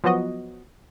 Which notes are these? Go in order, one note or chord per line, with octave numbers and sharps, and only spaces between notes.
F3 F#3 B3 F#4 D#5